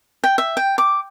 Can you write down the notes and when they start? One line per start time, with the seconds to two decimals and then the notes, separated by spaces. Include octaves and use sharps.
0.24 G5
0.38 E5
0.57 G5
0.78 D6